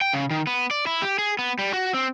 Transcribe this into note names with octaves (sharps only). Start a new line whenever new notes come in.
G5
C#3
D#3
B3
D5
E4
G4
G#4
B3
G3
F#4
C4